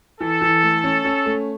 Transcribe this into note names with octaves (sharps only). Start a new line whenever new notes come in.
E3 A4
E3
A3
C#4
C#4
A3